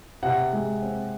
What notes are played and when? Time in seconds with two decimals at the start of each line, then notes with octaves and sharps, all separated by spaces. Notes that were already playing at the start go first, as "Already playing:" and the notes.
0.23 C3 F#5
0.53 G#3
0.82 C4